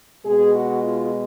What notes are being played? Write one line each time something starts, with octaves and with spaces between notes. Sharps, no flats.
B2 G#3 G#4
F#4
F4